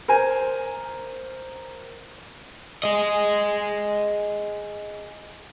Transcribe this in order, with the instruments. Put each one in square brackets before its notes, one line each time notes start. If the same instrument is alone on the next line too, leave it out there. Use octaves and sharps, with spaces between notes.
[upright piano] A#4 C5 G#5
[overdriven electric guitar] G#4 D#5